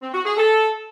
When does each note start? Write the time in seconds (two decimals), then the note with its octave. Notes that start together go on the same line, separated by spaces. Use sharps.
0.02 C4
0.13 F#4
0.25 G#4
0.37 A4